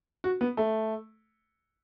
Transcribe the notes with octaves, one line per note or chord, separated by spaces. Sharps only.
F#4
B3
A3